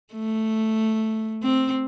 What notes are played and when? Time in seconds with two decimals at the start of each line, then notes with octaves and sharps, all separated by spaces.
0.13 A3
1.43 C4